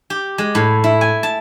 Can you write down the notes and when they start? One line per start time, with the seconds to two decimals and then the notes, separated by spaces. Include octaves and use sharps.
0.10 G4
0.38 G#3
0.55 A2
0.84 E4
1.01 G#5
1.23 A5